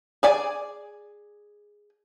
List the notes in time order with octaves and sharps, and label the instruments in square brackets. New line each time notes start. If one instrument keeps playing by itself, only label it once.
[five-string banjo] G#4 D5 G#5